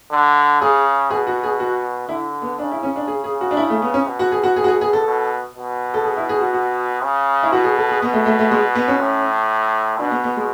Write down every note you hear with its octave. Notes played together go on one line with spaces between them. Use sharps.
D3
C#3 G#4
B2 G#4
F#4
G#4
F#4
D3 E4
B3
C#3 D4
E4
C#4
D4
G#4
G#4
F#4
D4
E4
A3
B3
C#4
B2
F#4
G#4
F#4
G#4
F#4
G#4
G#4
A4
B2
B2
A4
G#4
E4
G#4
F#4
F#4
C#3
E4
B2 F#4
G#4
A4
G#4
B2 B3
A3
A3
A3
G#3
B3
C#4
A2
B2 D4
B3
B3
G#3